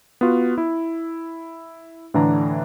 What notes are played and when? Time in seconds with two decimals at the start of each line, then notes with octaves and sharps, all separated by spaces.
0.21 B3 F4 F#4
0.58 E4
2.14 A2 D3 E3 D4 A#5